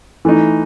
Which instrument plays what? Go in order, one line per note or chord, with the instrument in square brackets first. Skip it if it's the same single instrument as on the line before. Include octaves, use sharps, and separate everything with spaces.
[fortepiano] E3 A3 D#4